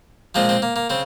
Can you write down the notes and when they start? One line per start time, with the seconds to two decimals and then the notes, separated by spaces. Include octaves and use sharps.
0.35 A#2 F3 G#3 C4
0.49 C4
0.62 A#3
0.76 A#3
0.89 C#3 C4